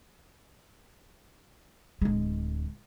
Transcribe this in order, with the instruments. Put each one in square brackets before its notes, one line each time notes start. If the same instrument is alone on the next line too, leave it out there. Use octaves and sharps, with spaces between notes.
[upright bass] D1 G#3